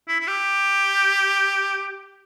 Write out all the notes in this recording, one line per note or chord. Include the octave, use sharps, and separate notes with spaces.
E4
E4
G4